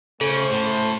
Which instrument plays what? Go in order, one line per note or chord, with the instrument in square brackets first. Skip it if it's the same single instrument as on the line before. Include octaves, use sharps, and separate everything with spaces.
[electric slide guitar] C#3 [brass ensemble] A3 F#4 C5 [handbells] A4
[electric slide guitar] A2